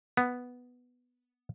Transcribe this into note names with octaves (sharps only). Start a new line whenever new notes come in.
B3